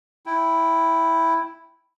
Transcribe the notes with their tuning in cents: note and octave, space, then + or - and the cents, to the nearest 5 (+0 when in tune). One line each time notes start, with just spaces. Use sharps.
E4 +0 G5 -5